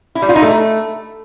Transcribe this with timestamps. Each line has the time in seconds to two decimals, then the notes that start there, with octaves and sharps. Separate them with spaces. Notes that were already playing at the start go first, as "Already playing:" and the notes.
0.15 E4
0.22 G3
0.29 F4
0.36 D#4
0.42 A3